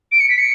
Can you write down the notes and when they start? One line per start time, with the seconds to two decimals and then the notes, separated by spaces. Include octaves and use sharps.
0.12 D7
0.20 C#7
0.29 B6
0.38 C#7